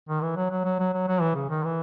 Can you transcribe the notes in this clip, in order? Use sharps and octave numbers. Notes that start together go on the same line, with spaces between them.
D#3
E3
F#3
F#3
F#3
F#3
F#3
F#3
E3
C#3
D#3
E3